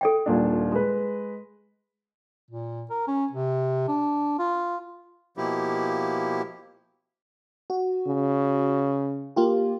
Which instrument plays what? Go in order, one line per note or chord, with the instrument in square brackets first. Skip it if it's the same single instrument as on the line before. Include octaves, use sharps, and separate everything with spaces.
[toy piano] A4 D5 G5
[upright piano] D#1 A#2 D4
G#3 B4
[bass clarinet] A#2
A#4
C#4
C3
D4
F4
[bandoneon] B2 F3 A#3 E4 G4
[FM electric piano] F#4
[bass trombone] C#3
[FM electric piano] A#3 F4 G4